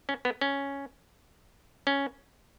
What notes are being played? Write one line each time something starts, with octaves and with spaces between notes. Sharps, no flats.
C#4
B3
C#4
C#4